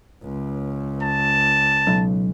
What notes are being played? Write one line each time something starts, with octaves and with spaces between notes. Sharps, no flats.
C#2
A5
B1